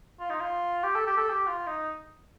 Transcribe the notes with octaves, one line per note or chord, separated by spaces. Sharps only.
F4
D#4
F4
G4
A4
G4
A4
G4
F4
D#4